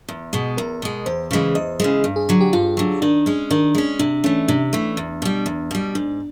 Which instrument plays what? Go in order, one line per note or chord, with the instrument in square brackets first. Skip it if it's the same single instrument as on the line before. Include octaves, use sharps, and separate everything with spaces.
[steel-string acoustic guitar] E2
B2 G#3
[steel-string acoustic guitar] E2 [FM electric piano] A#4
[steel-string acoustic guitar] B2 G#3
[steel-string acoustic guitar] E2 [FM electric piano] C5
[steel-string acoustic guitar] C#3 E3 G#3
[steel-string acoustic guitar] E2 [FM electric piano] D#5
[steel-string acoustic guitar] C#3 E3 G#3
G2
[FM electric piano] G#4
[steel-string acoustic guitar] D3 F#3
[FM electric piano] G4
[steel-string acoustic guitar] G2 [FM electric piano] F4
[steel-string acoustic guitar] D3 F#3
[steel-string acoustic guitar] D#3 [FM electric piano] D4
[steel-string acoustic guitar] G#3 C#4
[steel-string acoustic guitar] D#3 [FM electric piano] D4
[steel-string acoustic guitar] G#3 C#4
[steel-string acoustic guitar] C3 [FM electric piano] D4
[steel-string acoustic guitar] E3 A3 [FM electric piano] C#4
[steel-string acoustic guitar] C3 [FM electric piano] D4
[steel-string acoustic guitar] E3 A3
E2
B2 G3
E2
B2 G3
[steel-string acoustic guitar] G#2 [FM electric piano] D4